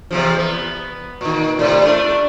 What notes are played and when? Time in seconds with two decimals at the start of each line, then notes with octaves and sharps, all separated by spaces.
0.11 E2 C3 F3
0.38 B3
1.21 A#2 D#3
1.57 F#2 A2 C3
1.83 A3 D4